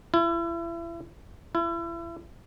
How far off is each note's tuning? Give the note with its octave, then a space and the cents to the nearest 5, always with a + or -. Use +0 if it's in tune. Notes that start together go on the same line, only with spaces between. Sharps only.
E4 +35
E4 +35